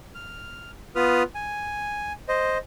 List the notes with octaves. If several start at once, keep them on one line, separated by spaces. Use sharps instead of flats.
F6
B3 F4 B4 D#6 F6
G#5
C5 D#5